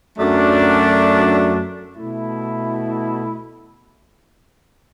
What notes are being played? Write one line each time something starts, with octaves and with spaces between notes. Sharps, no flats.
F#2 F#3 A3 D4
B2 A3 E4